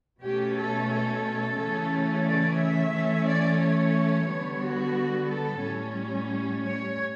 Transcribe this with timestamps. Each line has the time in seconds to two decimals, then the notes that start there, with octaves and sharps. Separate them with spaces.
0.22 B2 A3 C#4 G4
0.56 A4
0.90 A4
1.58 C#3 E3 A3 C#4
2.25 D5
2.59 E5
2.92 E3 A3 C#4
3.27 D5
3.60 C#5
4.27 D3 G3 B3
4.61 F#4
5.29 A4
5.62 A2 G3 C#4
6.64 C#5